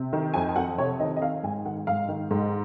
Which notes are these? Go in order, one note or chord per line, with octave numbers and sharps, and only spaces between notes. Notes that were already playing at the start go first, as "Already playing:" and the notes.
Already playing: C3
D#3
F2 G#5
G#5
F2 F#5
C3 C#5
D#3 D#5
D#5
D#3 F5
G#2 G#5
D#3 F#5
G#2 F5
D#3
G#2